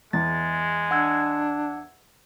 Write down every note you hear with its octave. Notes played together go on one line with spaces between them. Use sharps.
E2 G#3 A6
D4 F#5 E6 G#6